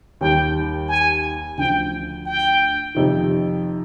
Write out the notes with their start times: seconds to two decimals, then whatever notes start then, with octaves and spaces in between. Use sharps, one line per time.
0.21 D#2 D#3 G3 G5
0.89 G#5
1.57 D2 D3 F3 G5
2.27 G5
2.95 F2 C3 D#3